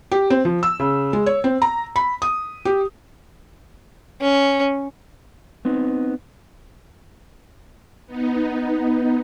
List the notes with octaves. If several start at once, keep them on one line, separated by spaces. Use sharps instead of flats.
G4
C4
F3
E6
C#3
G#3
C#5
C4
A#5
B5
D#6
G4
C#4
B3 C4 D#4
B3 D#4